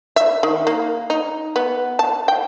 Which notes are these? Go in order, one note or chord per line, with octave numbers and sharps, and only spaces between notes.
E5
D#3
A#3
D#4
B3
A5
G5